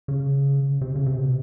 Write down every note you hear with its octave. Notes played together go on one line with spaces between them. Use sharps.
C#3
C3
C#3
C3
B2
C3